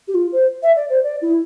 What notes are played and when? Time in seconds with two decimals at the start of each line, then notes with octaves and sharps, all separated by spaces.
0.08 G4
0.14 F4
0.32 C5
0.63 E5
0.76 D5
0.90 C5
1.03 D5
1.22 E4